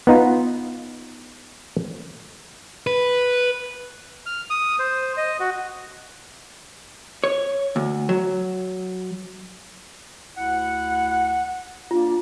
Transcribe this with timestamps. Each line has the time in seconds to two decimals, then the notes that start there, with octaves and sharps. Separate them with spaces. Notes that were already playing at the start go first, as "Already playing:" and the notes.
0.07 B3 D#4 F4
2.87 B4
4.26 F6
4.50 D#6
4.79 C5
5.17 D#5
5.40 F#4
7.24 C#5
7.76 D2
8.09 F#3
10.37 D2 E4 F#5
11.91 A#3 D4 F4